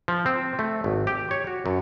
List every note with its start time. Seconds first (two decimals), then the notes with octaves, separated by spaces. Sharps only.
0.08 F3
0.26 C4
0.59 A3
0.84 G#1
1.07 G4
1.31 C#5
1.47 F#4
1.66 F#2